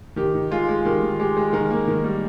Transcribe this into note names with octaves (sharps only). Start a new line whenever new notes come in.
D#3 G4
D#3
G#3 F4
G#3
D#3 G4
D#3
G#3 G4
G#3
D#3 A#4
A#3
D#3
G3